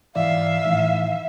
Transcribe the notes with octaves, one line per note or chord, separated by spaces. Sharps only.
G#2 E3 D5 E5 F5
A2 D#3 E3